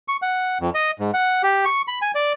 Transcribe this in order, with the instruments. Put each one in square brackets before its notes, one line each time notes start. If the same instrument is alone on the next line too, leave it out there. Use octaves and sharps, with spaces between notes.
[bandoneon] C#6
F#5
F2
D#5
G#2
F#5
G4
C#6
B5
G#5
D5